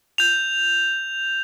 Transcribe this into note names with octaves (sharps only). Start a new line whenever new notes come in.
G6 F7